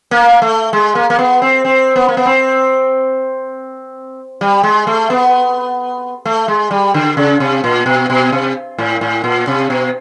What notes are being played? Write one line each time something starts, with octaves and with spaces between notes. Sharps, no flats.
A#3
A3
G#3
A#3
A#3
B3
C4
C4
B3
A#3
B3
C4
G3
G#3
A3
B3
A3
G#3
G3
D3
C#3
C3
A#2
B2
B2
C3
A2
A2
A#2
C3
B2